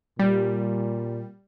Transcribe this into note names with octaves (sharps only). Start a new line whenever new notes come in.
A#2 G3